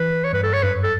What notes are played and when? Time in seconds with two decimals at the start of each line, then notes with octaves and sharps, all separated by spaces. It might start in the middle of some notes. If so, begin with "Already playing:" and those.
Already playing: E3 B4
0.24 C#5
0.33 G2 B4
0.43 A4
0.53 C#5
0.63 F#2 B4
0.83 A4